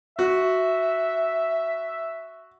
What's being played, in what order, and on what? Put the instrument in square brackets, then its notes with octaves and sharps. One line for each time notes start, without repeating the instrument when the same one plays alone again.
[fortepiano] F#4 [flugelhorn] E5